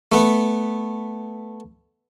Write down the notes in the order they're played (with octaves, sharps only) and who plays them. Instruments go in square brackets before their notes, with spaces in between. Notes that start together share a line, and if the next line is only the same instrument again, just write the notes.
[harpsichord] A3 B3